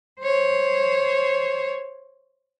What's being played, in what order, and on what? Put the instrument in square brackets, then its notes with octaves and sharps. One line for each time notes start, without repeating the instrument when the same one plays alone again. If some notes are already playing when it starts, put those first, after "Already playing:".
[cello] C5 C#5